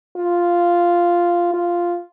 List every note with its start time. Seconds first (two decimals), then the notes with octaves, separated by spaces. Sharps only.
0.17 F4
1.53 F4